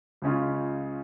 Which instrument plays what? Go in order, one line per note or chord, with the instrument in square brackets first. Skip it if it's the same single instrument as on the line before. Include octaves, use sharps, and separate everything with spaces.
[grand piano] C#2 C#3 G#3 C#4 F4